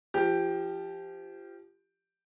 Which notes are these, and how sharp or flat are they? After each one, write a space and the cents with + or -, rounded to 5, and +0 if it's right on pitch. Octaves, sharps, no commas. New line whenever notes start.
F3 -20 G4 +0